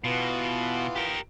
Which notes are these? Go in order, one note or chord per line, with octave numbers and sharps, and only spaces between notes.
B2 E3 B3 F4
G4 A#4